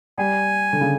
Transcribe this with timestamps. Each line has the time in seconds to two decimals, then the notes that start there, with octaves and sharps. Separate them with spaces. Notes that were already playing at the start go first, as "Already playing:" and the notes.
0.18 G3 G#5
0.73 D3
0.81 C#3